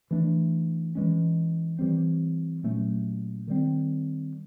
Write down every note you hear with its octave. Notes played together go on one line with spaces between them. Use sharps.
E3 A3 D4
E3 G#3 C#4
E3 G3 C4
A#2 F#3 A3 C#4
D#3 G3 C4